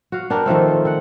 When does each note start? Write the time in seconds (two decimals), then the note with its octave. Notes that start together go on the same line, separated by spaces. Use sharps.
0.12 F#4 F5
0.30 B3 D4 G4 A#4
0.46 D#3 F3 A3 C4
0.68 C4
0.85 C4 F#5